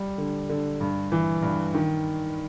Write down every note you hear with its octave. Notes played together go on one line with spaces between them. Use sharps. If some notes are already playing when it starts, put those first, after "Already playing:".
Already playing: G3
D3
D3
G2
E3
G2
D#3